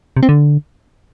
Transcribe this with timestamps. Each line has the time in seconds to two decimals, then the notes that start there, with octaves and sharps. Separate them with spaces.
0.17 C3
0.23 C4
0.29 D3